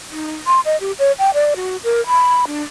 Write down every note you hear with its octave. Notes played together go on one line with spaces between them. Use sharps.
D#4
C6
D#5
G4
C#5
G5
D5
F#4
A#4
B5
D4